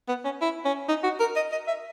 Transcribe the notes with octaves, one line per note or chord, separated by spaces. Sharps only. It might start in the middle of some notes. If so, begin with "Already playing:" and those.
B3
C#4
E4
C#4
D#4
F#4
A#4
D#5
D#5
E5